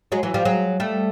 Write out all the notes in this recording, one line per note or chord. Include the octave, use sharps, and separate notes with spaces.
F#3 G#3
E3 F#3
F3 G3
F#3 G#3
G3 A3